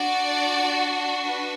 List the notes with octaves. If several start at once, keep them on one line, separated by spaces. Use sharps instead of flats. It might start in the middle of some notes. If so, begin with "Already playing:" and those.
Already playing: D4 F#4 D5
B4